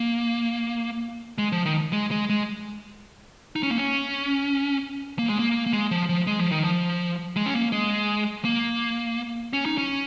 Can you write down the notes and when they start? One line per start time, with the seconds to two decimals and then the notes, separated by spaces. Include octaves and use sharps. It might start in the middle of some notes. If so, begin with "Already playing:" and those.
Already playing: A#3
1.38 G#3
1.52 F3
1.66 D#3
1.93 G#3
2.11 G#3
2.29 G#3
3.56 D#4
3.63 C#4
3.70 A#3
3.78 C#4
5.19 A#3
5.29 G#3
5.39 A#3
5.66 A#3
5.73 G#3
5.91 F3
6.09 F3
6.27 G#3
6.40 F3
6.51 D#3
6.64 F3
7.36 G#3
7.46 C#4
7.54 A#3
7.72 G#3
8.45 A#3
9.53 C#4
9.65 D#4
9.78 C#4